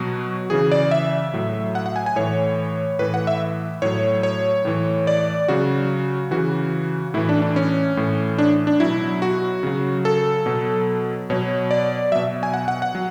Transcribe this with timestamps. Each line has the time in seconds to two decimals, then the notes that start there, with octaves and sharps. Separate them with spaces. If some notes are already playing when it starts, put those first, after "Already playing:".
Already playing: B2 F#3 F#4
0.50 C#3 E3 G#4
0.72 D5
0.91 E5
1.34 A2 F#3
1.75 F#5
1.86 F#5
1.96 G#5
2.06 G#5
2.16 A2 E3 C#5
2.99 A2 E3 B4
3.14 F#5
3.27 E5
3.82 A2 F#3 C#5
4.23 C#5
4.65 A2 E3
5.07 D5
5.48 C#3 F#3 F#4
6.31 C#3 E3 F#4
7.14 A2 E3 E4
7.29 D4
7.42 D4
7.56 C#4
7.97 A2 E3
8.38 D4
8.67 D4
8.80 B2 F#3 E4
9.22 F#4
9.63 C#3 F#3
10.05 A4
10.46 B2 F#3
11.30 B2 F#3 C#5
11.71 D5
12.12 B2 F#3 E5
12.43 G#5
12.54 F#5
12.68 F#5
12.82 F#5
12.95 F#3